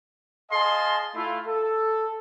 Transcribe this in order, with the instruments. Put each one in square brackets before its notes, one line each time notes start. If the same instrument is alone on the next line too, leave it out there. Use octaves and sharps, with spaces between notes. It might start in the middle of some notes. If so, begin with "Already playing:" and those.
[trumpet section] G#4 D#5 F5 G#5 A5 C6
A3 E4 F4
A4